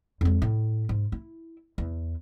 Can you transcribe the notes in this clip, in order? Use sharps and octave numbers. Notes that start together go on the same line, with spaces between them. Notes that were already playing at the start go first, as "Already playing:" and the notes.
F2 G#3
A2
G#2
E4
E2